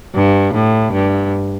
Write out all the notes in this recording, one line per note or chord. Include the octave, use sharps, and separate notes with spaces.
G2
A2
G2